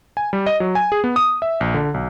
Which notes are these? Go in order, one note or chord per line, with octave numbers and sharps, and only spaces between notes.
G#5
G3
D#5
F#3
G#5
G#4
B3
D#6
E5
A#1
D3
B1